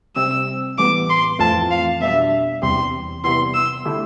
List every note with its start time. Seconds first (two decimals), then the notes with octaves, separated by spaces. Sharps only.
0.16 C3 G3 C4 E6
0.78 A2 E3 G3 B3 D6
1.09 C6
1.39 F2 E3 A3 C4 F4 A5
1.71 F5
2.00 B2 G3 D4 E5
2.62 E2 C3 G3 C4 G4 C6
3.24 C3 G3 B3 E4 C6
3.54 E6
3.85 D3 A3 E4 G4